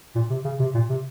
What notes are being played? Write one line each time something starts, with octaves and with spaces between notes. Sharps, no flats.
A#2
C3
C#3
C3
A#2
C3